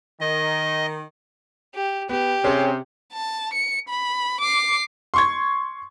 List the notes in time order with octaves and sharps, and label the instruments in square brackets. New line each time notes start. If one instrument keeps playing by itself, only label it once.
[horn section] D#3 [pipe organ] D#5
[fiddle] G4
[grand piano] B3 [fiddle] G4
[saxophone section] C3 [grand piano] C#4 G#4
[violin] A5
C#7
B5
D6 C7
[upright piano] C6 C#6 G#6